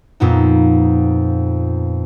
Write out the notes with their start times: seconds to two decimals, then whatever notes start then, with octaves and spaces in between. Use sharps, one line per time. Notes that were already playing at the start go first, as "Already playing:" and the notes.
0.20 F2 A#2 B3 D#4